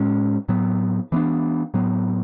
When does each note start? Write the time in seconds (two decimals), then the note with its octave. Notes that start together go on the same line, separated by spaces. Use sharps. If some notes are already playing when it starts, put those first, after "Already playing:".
Already playing: A2 G#3 C#4
0.49 A2 F#3 B3
1.12 E3 B3 D4
1.74 A2 F#3 B3